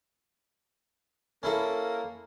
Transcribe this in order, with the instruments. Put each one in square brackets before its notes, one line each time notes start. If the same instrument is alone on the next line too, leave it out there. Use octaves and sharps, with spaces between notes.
[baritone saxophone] A#3 [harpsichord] C#4 E4 A4